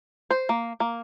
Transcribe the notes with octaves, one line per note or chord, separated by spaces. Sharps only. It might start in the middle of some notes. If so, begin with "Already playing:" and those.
C5
A#3
A#3